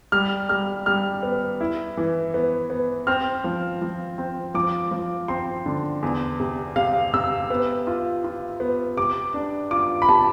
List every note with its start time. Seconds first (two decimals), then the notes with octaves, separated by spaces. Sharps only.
0.12 G3 F6
0.49 G3 F6
0.86 G3 F6
1.23 B3
1.61 E4
1.97 E3
2.34 B3
2.70 B3
3.07 C4 F6
3.44 F3
3.82 F3
4.18 C4
4.54 F3 D6
4.91 F3
5.28 C4 C6
5.66 D3
6.03 E2
6.40 C3
6.76 C3 F5
7.13 C3 E6
7.50 B3
7.87 F4
8.24 F4
8.60 B3
8.97 C3 D6
9.34 D4
9.71 F4 D6
10.02 B5
10.08 C3 A5